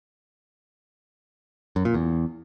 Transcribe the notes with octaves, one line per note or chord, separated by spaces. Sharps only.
F#2
A#2
E2